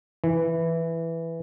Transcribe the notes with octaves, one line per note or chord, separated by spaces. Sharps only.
E3